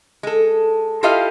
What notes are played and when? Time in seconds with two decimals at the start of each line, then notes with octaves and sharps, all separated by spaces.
0.23 G#3 A4
1.03 E4 F4 G4 A4 D#5 F5